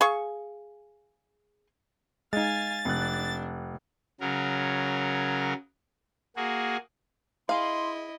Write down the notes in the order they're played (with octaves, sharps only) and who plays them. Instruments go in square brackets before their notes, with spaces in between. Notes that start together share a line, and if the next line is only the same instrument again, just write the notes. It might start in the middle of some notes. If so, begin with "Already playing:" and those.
[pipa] G#4 F5 C#6
[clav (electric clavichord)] G#3 D#4 [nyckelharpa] F5 G#5 [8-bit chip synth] A6
[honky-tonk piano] F1 F#6 [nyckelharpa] D4
[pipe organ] C#3 F#3 A#4
A#3 F#4 G#4
[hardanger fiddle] E4 D#5 [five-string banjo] G#4 F5 [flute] C6